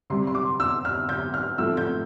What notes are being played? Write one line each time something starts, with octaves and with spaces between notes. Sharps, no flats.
C3 G3 C4 C6
C6
D6
E6
F6
G6
F6
A2 F3 A3 C4 E6
G6